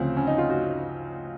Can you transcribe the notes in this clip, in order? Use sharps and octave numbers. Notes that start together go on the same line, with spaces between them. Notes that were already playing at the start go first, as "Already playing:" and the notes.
Already playing: D2 C#3 F3 C4
C#4
D#4
F4
F#4